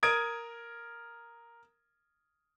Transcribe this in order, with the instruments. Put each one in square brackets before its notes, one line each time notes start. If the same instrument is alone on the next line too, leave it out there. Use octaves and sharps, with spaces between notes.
[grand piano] A#4 D#6 G#6 D7